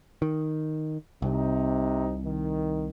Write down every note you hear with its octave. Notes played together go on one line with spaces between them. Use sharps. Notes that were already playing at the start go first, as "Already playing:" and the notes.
D#3
C2 C3 D#4
D#3